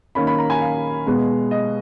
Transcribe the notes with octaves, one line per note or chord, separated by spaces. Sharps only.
D#3 A#3 C#4 B5
B5
A#5
G#5
F5
B2 G#3 B3
D#5